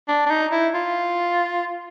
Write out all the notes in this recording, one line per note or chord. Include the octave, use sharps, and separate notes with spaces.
D4
D4
D#4
E4
F4